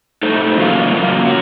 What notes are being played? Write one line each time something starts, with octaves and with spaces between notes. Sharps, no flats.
A3 D#4 A4 C5
F#2 C#3 F#3 A#3 F4
F#2 C#3 F#3 A#3 F4
C#4 F#4